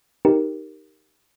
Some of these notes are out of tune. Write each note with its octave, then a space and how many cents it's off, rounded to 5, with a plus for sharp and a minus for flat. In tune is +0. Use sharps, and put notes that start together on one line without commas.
D#4 +0 G4 +0 A#4 +0